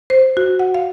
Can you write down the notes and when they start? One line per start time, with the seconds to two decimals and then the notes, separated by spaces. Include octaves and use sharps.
0.10 C5
0.37 F#4
0.59 F#5
0.74 F5